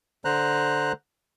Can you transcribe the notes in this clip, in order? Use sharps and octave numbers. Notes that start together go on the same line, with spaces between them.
D3 C5 A#5 F#6